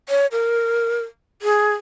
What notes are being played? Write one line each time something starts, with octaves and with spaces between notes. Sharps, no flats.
C#5
A#4
G#4